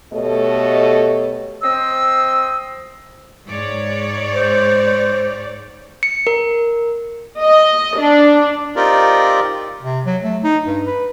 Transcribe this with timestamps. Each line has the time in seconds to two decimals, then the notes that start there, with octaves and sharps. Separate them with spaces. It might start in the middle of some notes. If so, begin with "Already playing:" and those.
0.14 B2 A3 G4 A4 C#5 D#5
1.62 C4 C5 D#5 E6
3.48 G#2 C#5 D5
4.34 C5
6.03 C#7
6.27 A#4
7.41 D#5
7.99 D4
8.76 C4 D#4 F4 G4 A#4 D5
9.83 C3
10.06 F#3
10.23 A3
10.44 D#4
10.66 G2
10.87 B4